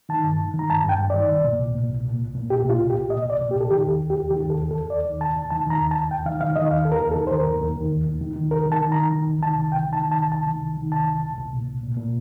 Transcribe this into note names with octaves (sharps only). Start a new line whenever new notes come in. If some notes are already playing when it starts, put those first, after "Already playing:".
D#3 A5
G2
D#3
D#3
A#5
G2 A5
G2 G5
G2
D#3 D5
C2
A#2
C2
A#2
C2
A#2
C2
A#2
C2 G4
A#2 F4
C2
G4
C2
A#2 D#5
C2 D5
A#2
G4
C2
A4
D#3 G4
D#2
D#2
G4
D#2
D#3 G4
D#2 A4
D#2
A4
D#2
D#2 D5
D#3
D#2 A5
D#2
D#3 A5
D#3 A#5
D#2
A5
D#2
D#2 G5
D#3 F5
D#3 F5
D#3 D#5
D#2 F5
D#2 A4
A#4
D#2
A4
D#3
C5
D#2 A#4
D#2
D#2
D#3
D#2
D#2
D#3
D#3
C2 A#4
D#3
A5
D#3
A#5
D#3
D#3
C2
D#3 A5
C2
C2 G5
D#3
A5
D#3
A5
C2
C2 A5
D#3
C2
D#3
C2 A5
C2
C2
C2
A#2
C2
A#2
A#2